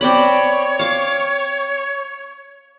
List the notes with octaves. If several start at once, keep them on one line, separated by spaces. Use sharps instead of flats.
C4 C#5 D5 B5
F5 D6